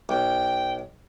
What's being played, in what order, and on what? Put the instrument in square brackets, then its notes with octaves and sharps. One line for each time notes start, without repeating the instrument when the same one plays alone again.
[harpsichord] B1 [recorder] G5